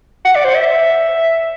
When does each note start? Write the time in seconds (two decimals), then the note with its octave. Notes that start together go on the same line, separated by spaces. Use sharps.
0.25 F#5
0.36 D5
0.45 C5
0.55 E5